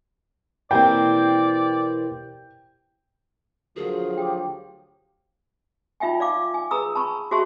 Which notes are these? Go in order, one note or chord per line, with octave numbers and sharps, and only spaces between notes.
B2 E3 A#3 C4 G4 A#4 D5 G5
D2 F3 F#3 F#4 G#4 A#4
G4 G5 D6
D#4 F4 E5 G5 G#5
D5 F5 D6
G#5
G#4 B4 A#5 D#6 E6
A5 B5 C#6
F#4 G#4 C5 E5 A5 C#6